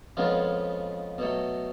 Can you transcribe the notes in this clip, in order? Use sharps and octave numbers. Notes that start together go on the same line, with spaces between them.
F2 C#3 F3 G#3 B3 F4
B2 F#3 A3